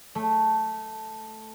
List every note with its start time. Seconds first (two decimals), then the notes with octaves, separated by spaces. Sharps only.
0.15 A3